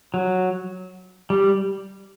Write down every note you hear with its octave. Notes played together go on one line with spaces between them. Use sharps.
F#3
G3